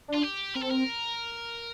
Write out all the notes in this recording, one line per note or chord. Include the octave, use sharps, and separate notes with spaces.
D4
F4
G4
C4 A#4
A4
A#4